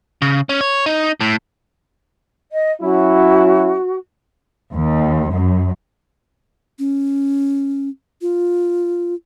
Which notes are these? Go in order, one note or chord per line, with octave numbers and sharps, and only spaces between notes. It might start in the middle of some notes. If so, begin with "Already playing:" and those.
C#3
C#4
C#5
D#4
A2
D#5
F#3 C#4 E4 F#4
D#2
F#2
C#4
F4